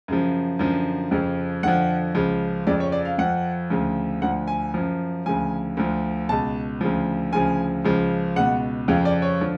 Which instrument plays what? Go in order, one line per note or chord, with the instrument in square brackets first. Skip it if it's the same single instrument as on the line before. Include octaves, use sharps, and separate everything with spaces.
[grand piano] F#2 C#3 F3
F#2 D3 F3
F2 C#3 F3
F2 D3 F3 F#5
C#2 C#3 F3
F2 C#3 F3 D5
C#5
D5
F5
F2 F3 F#5
D2 C#3 F3
D2 D3 F3 F#5
G#5
F#2 F3
D2 C#3 F3 G#5
D2 D3 F3
C#2 B2 A5
D2 C#3 F3
D2 C#3 F3 G#5
C#2 C#3 F3
C#2 B2 F#5
F2 C#3 F3 F5
D5
C#5
D3 F3